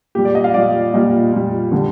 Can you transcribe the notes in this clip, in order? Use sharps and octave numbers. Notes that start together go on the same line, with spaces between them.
A#2 G3 G4
D5
D#5
F5
A#2 G3 D5
A#2 G3 D#5
A#2 G3
D3 G3